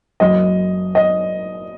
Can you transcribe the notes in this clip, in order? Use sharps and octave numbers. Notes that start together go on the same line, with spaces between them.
F#1 F#2 F#3 D#5
D#5